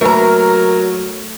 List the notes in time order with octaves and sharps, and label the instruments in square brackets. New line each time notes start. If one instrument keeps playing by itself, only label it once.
[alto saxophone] F#3 [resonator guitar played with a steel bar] A3 A#5 [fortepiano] A#3 B4 [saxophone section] A#4